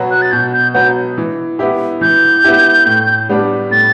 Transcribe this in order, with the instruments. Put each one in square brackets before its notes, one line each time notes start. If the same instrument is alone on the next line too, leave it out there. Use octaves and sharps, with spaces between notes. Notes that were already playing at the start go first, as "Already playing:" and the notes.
Already playing: [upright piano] B2 F#3 B3 F#4
[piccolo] F#6
A6
[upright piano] B2 [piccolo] G6
[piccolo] G6
[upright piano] F#3 B3 F#4 [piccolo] G6
[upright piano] E3
B3 E4 G4
[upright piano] E3 [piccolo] G6
[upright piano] B3 E4 G4
A2
G3 B3 D4
[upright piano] A2 [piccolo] A6